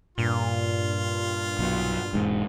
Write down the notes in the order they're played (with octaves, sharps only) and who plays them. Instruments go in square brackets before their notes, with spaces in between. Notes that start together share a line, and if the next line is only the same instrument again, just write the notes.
[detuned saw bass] G2 [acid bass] A#2 [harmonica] F4
[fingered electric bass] B1 B2
E1 G#2